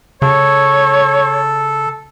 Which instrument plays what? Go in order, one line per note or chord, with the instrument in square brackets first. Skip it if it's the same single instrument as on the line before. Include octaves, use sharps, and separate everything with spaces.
[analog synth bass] C#3 [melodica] A4 [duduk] C#5